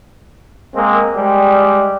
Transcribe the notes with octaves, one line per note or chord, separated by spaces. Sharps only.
G#3 A#3 C4
G3 G#3